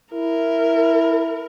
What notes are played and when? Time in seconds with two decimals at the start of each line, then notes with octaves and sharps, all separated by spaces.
0.13 E4 A#4